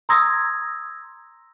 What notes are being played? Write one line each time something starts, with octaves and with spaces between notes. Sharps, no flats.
A#5 C6 D#6 E6 G#6 A#6